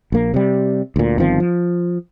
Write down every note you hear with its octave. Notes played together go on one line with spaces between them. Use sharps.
A#1 A#3
C3 G3
D2 A#2
G1 D#3 F3 C4
F3